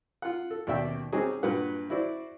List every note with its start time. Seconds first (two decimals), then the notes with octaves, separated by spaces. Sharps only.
0.22 F4 F#5
0.51 A4
0.67 D#2 B2 D5 E5 G5
1.12 G3 C4 C#4 D#4 F#4 G#4
1.43 G2 A#2 F#3 B4 F#5
1.90 E4 F#4 C5 D5